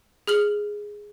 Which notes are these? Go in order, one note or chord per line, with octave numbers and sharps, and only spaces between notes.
G#4 F6 F#7